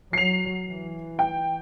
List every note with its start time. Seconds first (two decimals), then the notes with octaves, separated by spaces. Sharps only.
0.13 F#3 C7 F7
0.67 E3
1.19 G5